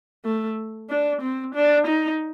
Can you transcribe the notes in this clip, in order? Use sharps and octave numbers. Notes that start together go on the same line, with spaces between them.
A3
D4
C4
D4
D#4